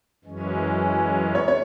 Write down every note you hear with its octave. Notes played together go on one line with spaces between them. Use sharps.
F#2 E3 G#3 C#4
C#5
C#5